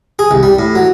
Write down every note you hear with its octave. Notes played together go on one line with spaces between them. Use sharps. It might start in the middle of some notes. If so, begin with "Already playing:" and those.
G#4
C2
G3
A2
F#3